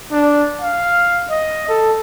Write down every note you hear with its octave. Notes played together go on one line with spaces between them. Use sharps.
D4
F5
D#5
A4